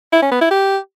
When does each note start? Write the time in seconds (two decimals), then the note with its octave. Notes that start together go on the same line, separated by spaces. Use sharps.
0.12 E4
0.22 C#4
0.31 B3
0.41 E4
0.51 G4